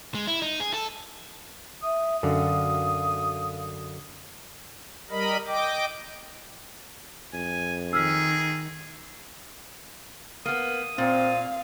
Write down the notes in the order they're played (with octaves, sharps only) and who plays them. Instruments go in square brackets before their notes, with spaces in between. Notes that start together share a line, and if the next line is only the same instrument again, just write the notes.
[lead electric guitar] G#3
E4
D#4
G#4
A4
[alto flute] E5 [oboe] D#6
[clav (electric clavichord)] F#2 D3 [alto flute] F5
[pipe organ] G3 A#4 D#5 B5
D#5 G5 D6
[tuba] F2 [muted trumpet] G#5
[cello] D#3 [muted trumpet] G#4 [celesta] E6 F6 B6
[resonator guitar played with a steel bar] A#3 B3 [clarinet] D#6
[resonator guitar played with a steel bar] A#2 [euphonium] C4 [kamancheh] F5